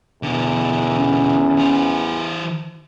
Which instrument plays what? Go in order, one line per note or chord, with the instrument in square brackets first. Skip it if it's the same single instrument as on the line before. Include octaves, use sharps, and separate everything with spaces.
[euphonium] E2 [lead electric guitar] B2 D3
[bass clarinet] C#4
[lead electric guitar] E3 C5